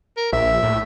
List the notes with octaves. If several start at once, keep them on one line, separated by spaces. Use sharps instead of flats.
A#4
A#1 E5
A2